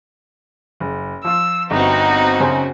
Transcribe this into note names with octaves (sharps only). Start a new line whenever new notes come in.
F#1
F3 F4 E6
G1 C4 D#4 F#4
F#2 C#3 C5